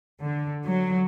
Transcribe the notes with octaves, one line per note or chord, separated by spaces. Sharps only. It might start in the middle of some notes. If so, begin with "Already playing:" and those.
D3
F#3